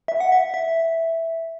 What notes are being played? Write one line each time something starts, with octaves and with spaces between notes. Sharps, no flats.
E5
F#5
E5
E5